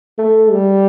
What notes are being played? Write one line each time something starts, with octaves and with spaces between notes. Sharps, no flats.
A3
G3